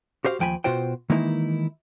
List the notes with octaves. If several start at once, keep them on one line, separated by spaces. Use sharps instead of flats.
F#4 G4 C5 F5
D#2 F3 G5 G#5 B5
B2 F4 F#4 C5 G5
D#3 E3 G#3 A#3 D#4 E4